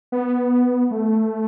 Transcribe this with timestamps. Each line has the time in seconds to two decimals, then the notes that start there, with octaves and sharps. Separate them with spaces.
0.12 B3
0.91 A3